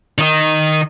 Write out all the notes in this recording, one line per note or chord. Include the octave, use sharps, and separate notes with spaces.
D#3 D#4